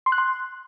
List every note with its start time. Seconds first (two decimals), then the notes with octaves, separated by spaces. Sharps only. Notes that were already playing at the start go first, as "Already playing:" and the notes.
0.06 C6
0.12 F#6
0.18 C6